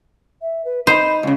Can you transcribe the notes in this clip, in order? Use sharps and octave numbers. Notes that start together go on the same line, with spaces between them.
E5
B4
D#4 C5 B5
C#2 C#3